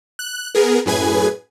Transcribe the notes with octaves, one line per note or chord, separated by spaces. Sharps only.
F#6
B3 G#4 A#4
F#2 A2 G#4 B4 G#5 G#6